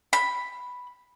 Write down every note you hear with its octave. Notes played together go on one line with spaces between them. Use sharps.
B5